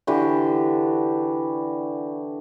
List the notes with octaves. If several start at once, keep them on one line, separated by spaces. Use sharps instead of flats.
D3 E3 F#4 G4